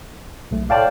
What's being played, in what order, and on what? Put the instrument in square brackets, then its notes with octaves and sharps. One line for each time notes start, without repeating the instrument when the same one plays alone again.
[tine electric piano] B1 A3
[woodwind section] A2 D5 [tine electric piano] F5 G5 A5